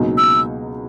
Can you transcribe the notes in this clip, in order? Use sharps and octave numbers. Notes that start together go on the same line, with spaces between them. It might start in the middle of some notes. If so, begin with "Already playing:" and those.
Already playing: C#2 B2 F#3 A#3 D#4
E6